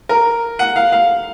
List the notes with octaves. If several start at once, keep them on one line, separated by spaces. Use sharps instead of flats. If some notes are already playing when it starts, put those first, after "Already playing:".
A#4
F#5
F5
F5